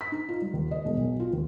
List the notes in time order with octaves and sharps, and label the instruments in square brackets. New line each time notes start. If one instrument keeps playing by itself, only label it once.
[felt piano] B6
D#4
F4
G3
D#2
D#5
E1
B1
F4
D#2